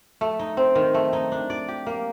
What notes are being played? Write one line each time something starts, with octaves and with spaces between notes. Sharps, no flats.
A3
D#4
C4
D#3
A3
D#4
D4
D5
G4
A#3